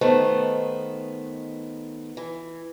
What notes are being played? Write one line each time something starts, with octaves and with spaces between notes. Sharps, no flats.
D#3 A3 B3 D#4 C5
E3